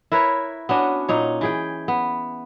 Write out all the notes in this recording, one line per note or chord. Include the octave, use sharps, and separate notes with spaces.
E4 A#4 B4 C#5
B3 C#4 D4 F#4
A#2 D#4 C#5
E3 G#4 G5
B3